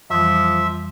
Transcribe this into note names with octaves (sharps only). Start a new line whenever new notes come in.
F2 E3 F3 G3 E5